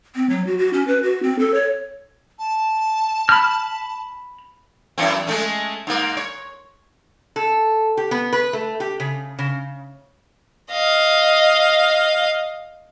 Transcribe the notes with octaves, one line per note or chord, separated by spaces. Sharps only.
C4
F#3
F#4
F#4
C#4
B4
F#4
C4
A4
C#5
A5
B5 F6
F#2 E3 C4
G#3 A3 C#4
G#2 A#3
C#5
A4
G4
B3
B4
A3
G4
C#3
C#3
D#5 F5